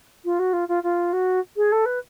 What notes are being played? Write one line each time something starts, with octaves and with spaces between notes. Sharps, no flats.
F4
F#4
F4
F4
F4
F#4
G#4
A4
B4